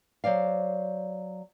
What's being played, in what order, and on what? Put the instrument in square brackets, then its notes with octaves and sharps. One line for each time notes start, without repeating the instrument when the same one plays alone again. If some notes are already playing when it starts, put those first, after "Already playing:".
[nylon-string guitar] F#3 C5 D5 F5